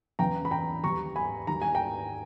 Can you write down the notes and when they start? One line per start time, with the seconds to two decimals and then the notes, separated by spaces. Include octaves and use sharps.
0.19 E2 C#3 E3 G5 A#5
0.45 B5
0.51 G5 A#5
0.84 D#2 C#3 G3 A#5 C#6
1.16 G#5 B5
1.47 D#2 D#3 G3 A#5
1.62 G#5
1.75 G5 A#5